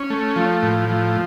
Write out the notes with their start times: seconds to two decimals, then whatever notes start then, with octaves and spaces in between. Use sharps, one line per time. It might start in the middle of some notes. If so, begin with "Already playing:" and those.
Already playing: C#4
0.10 A3
0.36 F3
0.63 A2
0.89 F3